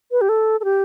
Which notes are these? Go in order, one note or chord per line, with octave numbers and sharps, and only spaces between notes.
B4
G4
A4
A4
G4